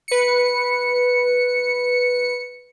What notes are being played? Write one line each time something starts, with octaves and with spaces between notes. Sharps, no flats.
B4 C#7